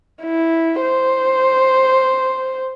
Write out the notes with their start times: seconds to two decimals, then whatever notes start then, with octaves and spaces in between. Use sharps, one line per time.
0.23 E4
0.81 C5